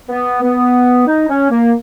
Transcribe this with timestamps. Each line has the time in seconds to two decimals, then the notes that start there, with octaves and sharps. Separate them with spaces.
0.09 B3
0.42 B3
1.07 D#4
1.29 C#4
1.50 A#3